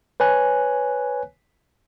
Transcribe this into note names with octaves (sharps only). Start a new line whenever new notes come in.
B4 C#5 G#5 F#6